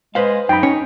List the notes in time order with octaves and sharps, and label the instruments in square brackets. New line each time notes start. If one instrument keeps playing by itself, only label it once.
[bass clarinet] G#3 [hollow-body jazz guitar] B4 C5 F5
[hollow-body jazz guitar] F#2 [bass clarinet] D#4 [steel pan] G5 B5
[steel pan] C#4 [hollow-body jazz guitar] C#5